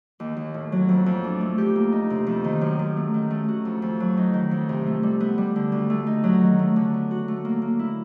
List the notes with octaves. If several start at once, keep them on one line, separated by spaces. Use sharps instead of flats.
D#2
D#2
A2
F#3
F2
F2
D4
A3
G4
A#3
D#4
C3
F2
D#3
F#2
F#2
A3
D#3
A3
F#4
F2
F2
F#3
D#4
D#3
F2
C3
A3
G3
B3
G3
D3
D2
A3
D#4
F#3
D#3
A3
D3
B3
F#4
A3
A#3
A#3
E4